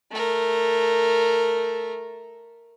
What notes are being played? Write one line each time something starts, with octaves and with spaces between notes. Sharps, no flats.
A3 A#4